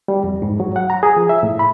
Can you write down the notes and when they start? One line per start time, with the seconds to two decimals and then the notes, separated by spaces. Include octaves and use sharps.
0.08 G3
0.24 F2
0.42 G#2
0.60 F#3
0.76 F#5
0.90 A#5
1.03 G#4
1.17 F3
1.29 E5
1.43 A2
1.59 B5